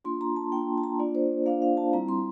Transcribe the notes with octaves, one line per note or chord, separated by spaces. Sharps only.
A#3 D4 F4 C6
A#5
A5
A#3 D4 F4 G5
A5
A#5
A#3 D4 F4 D5
C5
A#3 D4 F4 F5
F5
A5
G3 C4 E4 A#5
C6